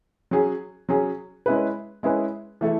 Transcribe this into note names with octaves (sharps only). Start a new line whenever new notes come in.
F#3 C#4 G#4
F#3 C#4 G#4
G#3 C#4 E4 G#4 B4
G#3 C#4 E4 G#4 B4
E3 A3 E4 A4